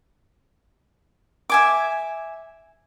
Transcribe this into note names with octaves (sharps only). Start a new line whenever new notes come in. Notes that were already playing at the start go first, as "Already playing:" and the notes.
E5 G#5 D6